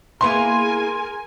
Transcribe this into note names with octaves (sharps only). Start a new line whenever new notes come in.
A#3 B3 E4 G#4 A#4 G#5 C6